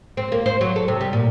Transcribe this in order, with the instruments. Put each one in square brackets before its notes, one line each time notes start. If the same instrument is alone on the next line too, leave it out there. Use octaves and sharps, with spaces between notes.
[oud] C4
A#3
C5
F#3
A4
C3
G3
A#2